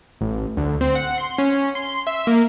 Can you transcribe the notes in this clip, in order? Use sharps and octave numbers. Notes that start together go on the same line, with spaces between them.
A1
D2
C4
F#5
C6
C#4
C6
E5
A#3